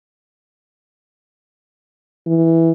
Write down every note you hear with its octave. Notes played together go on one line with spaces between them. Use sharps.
E3